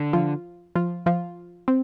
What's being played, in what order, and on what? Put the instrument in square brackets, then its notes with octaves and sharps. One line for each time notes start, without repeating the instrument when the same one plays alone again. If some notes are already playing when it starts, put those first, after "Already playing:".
Already playing: [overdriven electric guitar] D3
[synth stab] F3 F4
F3 F4
F3 F4
C4